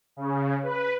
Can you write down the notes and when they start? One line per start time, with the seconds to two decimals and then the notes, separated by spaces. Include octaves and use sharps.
0.17 C#3
0.63 B4